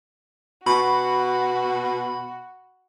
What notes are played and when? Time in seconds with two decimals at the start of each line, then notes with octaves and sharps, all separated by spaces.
0.67 B2 F#4 B5